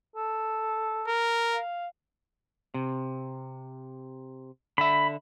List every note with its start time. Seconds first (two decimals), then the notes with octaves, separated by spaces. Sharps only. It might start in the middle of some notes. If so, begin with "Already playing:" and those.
0.16 A4
1.08 A#4
1.54 F5
2.74 C3
4.78 D3 E5 B5